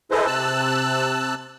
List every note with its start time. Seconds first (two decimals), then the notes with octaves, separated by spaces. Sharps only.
0.11 E4 G#4 A4 B4 C5 D#5
0.27 C3 A5 E6 F#6